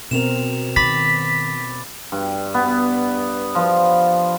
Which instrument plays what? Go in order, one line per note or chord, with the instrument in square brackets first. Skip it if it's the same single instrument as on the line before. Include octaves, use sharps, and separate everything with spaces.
[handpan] B2 C4 A#4 [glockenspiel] E7 F7
[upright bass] D#3 [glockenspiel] B5 D6 A6 [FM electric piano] B6
[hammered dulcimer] G2
B3
F3